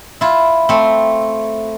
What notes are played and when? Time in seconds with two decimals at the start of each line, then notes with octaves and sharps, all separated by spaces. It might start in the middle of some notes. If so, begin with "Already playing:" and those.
0.21 E4 F4
0.69 A3 C4